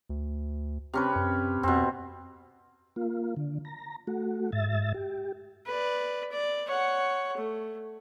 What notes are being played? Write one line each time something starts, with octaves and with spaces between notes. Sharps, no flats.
D2
C3 C#4 B4
F#2
F2 B2 C4
A#3 F4
D3
A#5
A3 F#4
G#2 E5 A6
G4
B4 D5
D5
C#5 F#5
A3